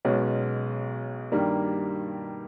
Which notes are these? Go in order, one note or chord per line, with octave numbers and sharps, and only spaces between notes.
B1 B2 G#3 C#4
G2 D#3 G3 A#3